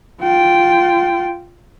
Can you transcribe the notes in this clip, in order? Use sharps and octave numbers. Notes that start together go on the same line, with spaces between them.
F4 G5